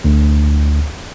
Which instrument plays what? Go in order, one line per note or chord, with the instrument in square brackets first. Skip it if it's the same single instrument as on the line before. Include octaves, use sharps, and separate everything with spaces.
[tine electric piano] D2